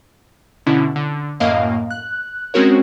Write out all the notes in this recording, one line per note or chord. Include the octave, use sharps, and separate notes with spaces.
B2 D3 C#4 E4
D3
F#2 A2 A#3 D#5 F5
F#6
G#3 C4 C#4 F#4 A#4 C#5